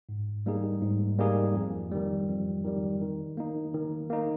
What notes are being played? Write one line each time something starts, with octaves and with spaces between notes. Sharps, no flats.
G#2
G3 A#3 D#4 G#4
G#2
G3 A#3 D#4 G#4
F2
D#3 G3
F2
D#3 G3
D#3
A#3 D#4
D#3
A#3 D#4